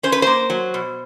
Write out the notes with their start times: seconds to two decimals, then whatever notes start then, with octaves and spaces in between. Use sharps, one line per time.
0.03 C#4 C5
0.12 B4
0.22 A#3 C5
0.50 F#3
0.74 B2